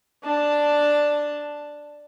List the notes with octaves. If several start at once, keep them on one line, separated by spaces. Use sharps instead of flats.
D4 A5